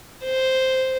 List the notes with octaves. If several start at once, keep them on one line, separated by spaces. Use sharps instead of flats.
C5